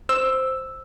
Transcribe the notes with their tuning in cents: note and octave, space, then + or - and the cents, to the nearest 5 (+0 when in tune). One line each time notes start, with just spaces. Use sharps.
C5 +0 E6 +0